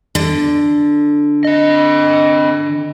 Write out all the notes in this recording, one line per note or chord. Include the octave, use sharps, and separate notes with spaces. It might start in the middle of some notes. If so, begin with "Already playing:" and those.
D3
C4 D#5